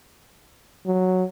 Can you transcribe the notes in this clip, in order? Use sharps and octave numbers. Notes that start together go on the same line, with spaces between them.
F#3